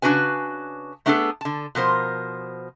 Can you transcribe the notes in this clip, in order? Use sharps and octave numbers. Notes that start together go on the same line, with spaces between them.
C#3 C4 D4 F#4 B4 G#5
A3 B3 D4 F#4 G#4 A4
D3 A5
B2 F3 A#4 C5